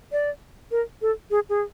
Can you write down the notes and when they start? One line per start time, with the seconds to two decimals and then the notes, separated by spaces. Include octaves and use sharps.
0.12 D5
0.71 A#4
1.02 A4
1.31 G#4
1.49 G#4